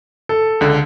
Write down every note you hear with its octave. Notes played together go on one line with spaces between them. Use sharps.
A4
C#2 D3